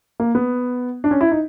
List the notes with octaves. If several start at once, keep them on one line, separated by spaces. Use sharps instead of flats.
A#3
B3
D4
C#4
E4
D#4